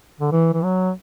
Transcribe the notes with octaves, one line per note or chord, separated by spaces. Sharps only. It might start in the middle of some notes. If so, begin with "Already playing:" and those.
D3
E3
E3
F#3